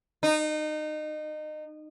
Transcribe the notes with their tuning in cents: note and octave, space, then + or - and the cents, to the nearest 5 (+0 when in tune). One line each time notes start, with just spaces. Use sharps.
D#4 -25